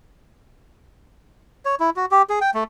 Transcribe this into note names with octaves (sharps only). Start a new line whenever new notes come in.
C#5
E4
F#4
G4
G#4
G5
A3